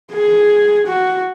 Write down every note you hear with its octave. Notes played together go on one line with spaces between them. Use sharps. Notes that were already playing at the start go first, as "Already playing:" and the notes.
G#4
F#4